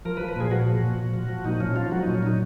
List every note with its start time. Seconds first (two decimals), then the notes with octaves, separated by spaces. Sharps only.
0.05 F3 A#4
0.17 B4
0.21 F3
0.29 B4
0.36 A#2 G#4
0.51 F3 F#4
0.67 F3
0.83 A#2
0.98 A#2
1.14 F3
1.29 F3
1.45 A#2 D#4
1.60 F3 C#4
1.76 F3 F4
1.91 F#3 F#4
2.03 A#2 D#4
2.15 C#4
2.23 F#3 D#4